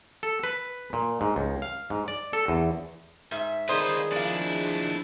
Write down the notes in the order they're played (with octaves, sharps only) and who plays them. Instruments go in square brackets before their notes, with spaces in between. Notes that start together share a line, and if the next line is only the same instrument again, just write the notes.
[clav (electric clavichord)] A4
B4
A#2
G#2
C#2
F5
G#2
D5
A4
E2
[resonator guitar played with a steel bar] G#2 E5
[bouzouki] D#3 G#4 D#5 [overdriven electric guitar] F4 B4 [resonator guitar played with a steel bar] C5 [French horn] D5
[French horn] F3 [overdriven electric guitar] D4 E4 [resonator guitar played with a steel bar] D5 F5